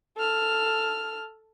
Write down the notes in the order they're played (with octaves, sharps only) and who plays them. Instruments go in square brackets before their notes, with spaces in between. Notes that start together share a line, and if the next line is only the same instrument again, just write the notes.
[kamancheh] A4 F6